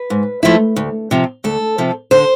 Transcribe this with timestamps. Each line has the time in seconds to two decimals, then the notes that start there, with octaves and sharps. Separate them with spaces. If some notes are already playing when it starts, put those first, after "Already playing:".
Already playing: B4
0.10 G#2
0.43 F3 A3 E4
0.76 D2
1.11 C3 F3
1.44 D2 A4
1.78 C3 F3
2.11 D3 C5